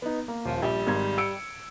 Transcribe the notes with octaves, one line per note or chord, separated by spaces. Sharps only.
B3 D#4
A#3
D#1 F3
A#1 G3
G#1 G#2 G#6
E6 C#7 D7